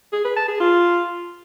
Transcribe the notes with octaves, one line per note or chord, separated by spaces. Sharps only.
G#4
B4
A5
G#4
F4